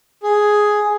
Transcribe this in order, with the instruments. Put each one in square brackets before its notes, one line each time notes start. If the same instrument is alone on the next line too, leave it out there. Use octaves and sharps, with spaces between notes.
[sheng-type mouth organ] G#4